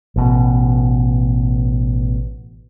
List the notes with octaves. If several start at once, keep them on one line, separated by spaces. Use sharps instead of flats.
A1 B2